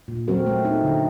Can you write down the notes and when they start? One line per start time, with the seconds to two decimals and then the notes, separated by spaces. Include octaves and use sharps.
0.08 A#2
0.28 F#3 C4 F#4 A#4
0.46 A3
0.65 C4 D#4
0.83 D3